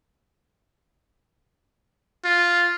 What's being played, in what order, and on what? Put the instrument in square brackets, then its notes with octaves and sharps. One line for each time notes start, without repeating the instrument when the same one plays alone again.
[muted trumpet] F4